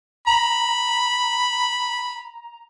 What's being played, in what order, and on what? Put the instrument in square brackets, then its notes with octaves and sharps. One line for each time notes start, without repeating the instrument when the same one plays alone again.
[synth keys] A#5 [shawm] B5